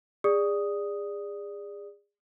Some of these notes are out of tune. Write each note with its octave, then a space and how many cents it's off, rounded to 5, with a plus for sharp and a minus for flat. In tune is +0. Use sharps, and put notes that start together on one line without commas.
G#4 -30 D5 +0 D#6 +0